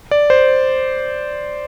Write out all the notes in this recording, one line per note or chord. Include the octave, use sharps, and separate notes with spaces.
D5
C5